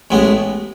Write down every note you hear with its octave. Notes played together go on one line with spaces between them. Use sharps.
A1 A2 G#3 B3